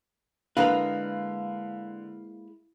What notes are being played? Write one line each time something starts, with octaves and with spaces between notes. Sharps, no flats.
D3 G#3 A#3 E4 B4 F5 F7